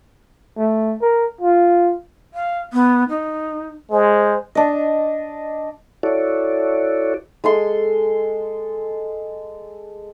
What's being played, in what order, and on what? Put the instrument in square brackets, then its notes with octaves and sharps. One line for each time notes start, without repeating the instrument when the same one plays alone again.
[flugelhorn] A3
A#4
F4
[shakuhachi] F5
B3
D#4
[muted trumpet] G#3 [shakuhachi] C5
[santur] D4 D#5
[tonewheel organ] E4 F#4 A4 C#5 D5
[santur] G#3 A4 C6